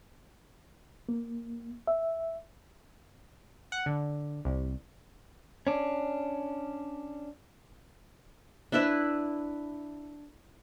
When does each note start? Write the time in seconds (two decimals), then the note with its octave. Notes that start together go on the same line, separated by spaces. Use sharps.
1.09 A#3
1.87 E5
3.72 F#5
3.86 D3
4.45 C2
5.67 C#4 D4
8.72 D4 E4 B4 E5